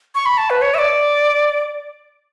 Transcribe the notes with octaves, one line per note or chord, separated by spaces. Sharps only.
C#6
B5
A5
B4
C#5
E5
D5